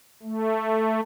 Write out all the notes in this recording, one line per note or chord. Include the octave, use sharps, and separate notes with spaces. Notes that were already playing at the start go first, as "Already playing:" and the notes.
A3